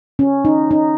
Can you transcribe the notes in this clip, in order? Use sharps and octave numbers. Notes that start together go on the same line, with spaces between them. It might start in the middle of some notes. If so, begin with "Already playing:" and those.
C#4
D#4
D#4